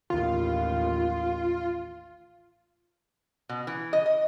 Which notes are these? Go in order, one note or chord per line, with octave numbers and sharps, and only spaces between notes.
A1 D#2 F4
B2
E3
D#5
D#5